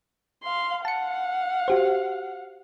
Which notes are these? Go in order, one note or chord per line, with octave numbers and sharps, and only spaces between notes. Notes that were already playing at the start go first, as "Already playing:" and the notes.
F5 C6
F5 F#5 A5 C#7
F#4 G4 C5